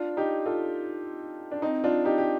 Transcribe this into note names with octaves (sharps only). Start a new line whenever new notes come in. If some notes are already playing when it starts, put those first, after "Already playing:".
Already playing: D4 F4
D#4 G4
F4 A4
D4
C4 D#4
D4 F4
D#4 G4
G4